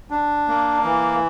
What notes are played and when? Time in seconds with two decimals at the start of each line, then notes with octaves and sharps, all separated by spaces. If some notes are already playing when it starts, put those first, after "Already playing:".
0.10 D4
0.48 A#3
0.84 E3